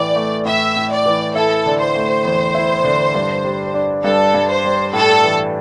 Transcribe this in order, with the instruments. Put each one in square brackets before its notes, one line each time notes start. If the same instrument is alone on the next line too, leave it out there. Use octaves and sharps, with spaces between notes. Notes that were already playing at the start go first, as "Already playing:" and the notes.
Already playing: [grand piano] A2 E3 [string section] D5
[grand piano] A3
[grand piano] A2 [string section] E5
[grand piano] A2
[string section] D5
[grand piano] E3
[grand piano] E4 [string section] A4
[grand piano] D3
[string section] C5
[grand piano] A3
E2
E4
D3
G2
G3
D4
[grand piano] G2 [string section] A4
[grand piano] G2
[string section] C5
[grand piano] G3
[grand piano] A2 [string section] A4
[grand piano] E3